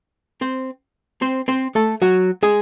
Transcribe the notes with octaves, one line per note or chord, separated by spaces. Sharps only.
C4 C5
C4 C5
C4 C5
A3 A4
F#3 F#4
G#3 G#4